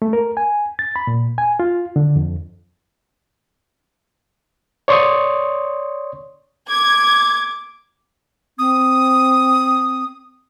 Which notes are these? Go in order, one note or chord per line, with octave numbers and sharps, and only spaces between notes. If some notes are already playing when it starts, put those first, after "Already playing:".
A3
A#4
G#5
A6
B5
A#2
G#5
F4
D3
F2
C#5 D5 C6 C#6 D#6
D6 G#6
C4 D#6